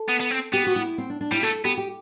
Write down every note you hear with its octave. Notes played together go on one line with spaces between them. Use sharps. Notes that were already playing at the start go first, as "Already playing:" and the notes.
Already playing: A4
B3
B3
C4
B3 G4
F#4
E4
C4
D4
D4
G3 E4
A3 A4
B3 G4
G4